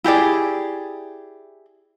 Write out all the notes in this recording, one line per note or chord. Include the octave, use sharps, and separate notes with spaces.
E4 G4 G#4 D5